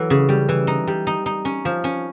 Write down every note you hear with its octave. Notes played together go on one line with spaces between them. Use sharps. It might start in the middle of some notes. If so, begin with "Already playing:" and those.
Already playing: E3 F#3 A3
C#3
G3
E3
D#4
G3
D#4
D#4
C#4
F3
C#4